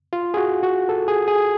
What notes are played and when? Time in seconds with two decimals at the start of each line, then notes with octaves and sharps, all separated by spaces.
0.13 F4
0.34 G#4
0.37 F#4
0.63 F#4
0.89 A4
1.08 G#4
1.28 G#4